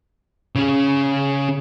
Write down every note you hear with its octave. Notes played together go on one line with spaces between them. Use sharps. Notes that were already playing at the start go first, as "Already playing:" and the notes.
C#3 C#4